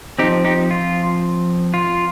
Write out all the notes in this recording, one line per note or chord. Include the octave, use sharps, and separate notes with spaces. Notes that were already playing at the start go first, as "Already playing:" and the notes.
F3 C4 D#4 G4
D#4 G4
F4
F4